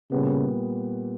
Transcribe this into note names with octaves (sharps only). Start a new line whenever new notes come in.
A#2 C#3 G3 B3